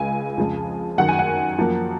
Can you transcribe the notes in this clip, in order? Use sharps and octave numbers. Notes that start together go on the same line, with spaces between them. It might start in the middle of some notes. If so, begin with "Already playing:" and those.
Already playing: C#2 C#3 G#3 G#5
F2 C#3 F3 G#3
F#2 D#3 F#3 F#5
G#5
F#5
F#2 F3 A#3